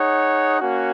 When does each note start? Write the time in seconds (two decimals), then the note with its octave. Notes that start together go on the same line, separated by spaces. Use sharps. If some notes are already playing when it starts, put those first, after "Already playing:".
Already playing: D#4 G#4 C#5 F#5
0.60 A#3 C#4 F#4